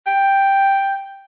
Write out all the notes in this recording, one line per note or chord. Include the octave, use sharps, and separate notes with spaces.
G5